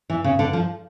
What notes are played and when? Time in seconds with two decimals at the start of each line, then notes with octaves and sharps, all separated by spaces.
0.10 E3
0.24 C#3
0.39 D3
0.53 F3